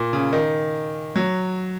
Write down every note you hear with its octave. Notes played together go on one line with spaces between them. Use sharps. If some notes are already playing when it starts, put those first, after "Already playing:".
Already playing: A#2
C#3
D#3
F#3